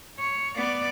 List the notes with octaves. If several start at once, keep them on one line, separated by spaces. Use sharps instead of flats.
C#5
B3 D5